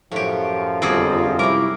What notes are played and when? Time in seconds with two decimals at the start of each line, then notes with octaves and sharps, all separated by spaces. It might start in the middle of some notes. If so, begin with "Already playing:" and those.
0.12 F#2 A2 F3 F#4 G4 C#5
0.82 G1 F2 C4 C#4 F#4 G#4 D6 E6
1.39 C3 G3 C4 E4 A#4 C#6 D6